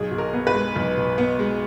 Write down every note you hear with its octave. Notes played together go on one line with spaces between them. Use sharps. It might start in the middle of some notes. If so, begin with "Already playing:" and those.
Already playing: B1 G#4
B2
A#4
B3
B4
G#3
B1
B2
B3
G#3